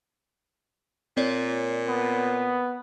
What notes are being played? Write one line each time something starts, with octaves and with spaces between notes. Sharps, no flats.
A#2 C4 C#5 D5
B3